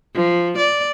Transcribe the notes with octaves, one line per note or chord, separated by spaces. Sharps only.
F3
D5